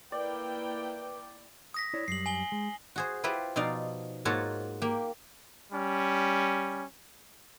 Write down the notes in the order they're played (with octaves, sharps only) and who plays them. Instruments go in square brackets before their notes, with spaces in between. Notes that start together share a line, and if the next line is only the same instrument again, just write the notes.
[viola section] A#3 E4 G5 [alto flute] B4 [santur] D5
[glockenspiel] D#6 A#6 B6
[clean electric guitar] E4 C#5 D5
[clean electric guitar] F#2 G3 [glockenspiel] C7 F#7
[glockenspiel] G#5 F#7 G7
[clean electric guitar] G#3
[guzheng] F#4 G#4 C5
E4 F4 G4 B4 C5
B2 F3 D#4 D5 F5 C6
G#2 A#3 F4 F#4 C#5 A5
A#3 G4
[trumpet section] G3 C#4